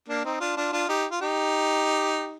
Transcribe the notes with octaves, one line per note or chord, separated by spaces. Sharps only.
A#3 D4
C4 D#4
D4 F4
D4 F4
D4 F4
D#4 G4
F4
D#4 G4